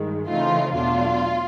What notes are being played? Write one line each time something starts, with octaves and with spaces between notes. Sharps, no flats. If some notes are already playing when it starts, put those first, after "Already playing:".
Already playing: G2 D#3 G#3
C#3 E3 A3 C4 D#4 F4
E2 B2 F#3 A3 D4 F4